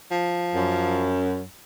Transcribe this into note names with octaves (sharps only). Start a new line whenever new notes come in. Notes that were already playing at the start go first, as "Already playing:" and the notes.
F3
F#2